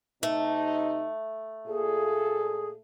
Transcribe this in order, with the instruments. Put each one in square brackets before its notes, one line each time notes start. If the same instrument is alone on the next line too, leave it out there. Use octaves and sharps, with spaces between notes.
[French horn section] C3 D#4 [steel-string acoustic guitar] A3
[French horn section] A#2 A4 [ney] G#4